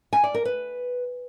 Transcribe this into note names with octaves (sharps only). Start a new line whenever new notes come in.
G#5
D5
A#4
B4